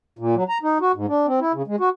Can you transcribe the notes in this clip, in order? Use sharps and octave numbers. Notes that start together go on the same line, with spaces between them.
A#2
F#3
A#5
D#4
F#4
G#2
D4
C4
E4
C#3
G#3
F#4